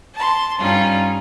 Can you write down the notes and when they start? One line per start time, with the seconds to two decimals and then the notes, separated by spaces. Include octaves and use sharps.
0.14 A5 C6
0.59 G2 G3 C#4 D#4 F4